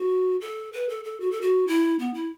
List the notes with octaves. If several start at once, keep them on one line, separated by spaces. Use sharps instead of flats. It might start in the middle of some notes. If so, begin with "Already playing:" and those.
Already playing: F#4
A4
B4
A4
A4
F#4
A4
F#4
E4
B3
E4